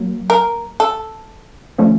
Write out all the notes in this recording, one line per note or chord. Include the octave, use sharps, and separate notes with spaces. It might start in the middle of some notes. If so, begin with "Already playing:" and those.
Already playing: F#3 A#3
A#4
A4
D3 F3 A3 C#4